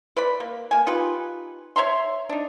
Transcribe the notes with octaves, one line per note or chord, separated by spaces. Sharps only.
B4 D5 B5
A#3
A#3 G#5
D#4 F4 G4 B4
C#5 E5 A#5 C6
D4 D#4